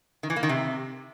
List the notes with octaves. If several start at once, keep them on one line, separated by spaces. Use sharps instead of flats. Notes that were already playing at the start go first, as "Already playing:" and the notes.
D#3
E3
A#3
D#3
C3